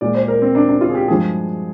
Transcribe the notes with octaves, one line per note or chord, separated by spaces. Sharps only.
A#2 G#3 D5
C5
A#4
C4
D4
D4
F4
G#4
G4
G2 F3 G#3 G#4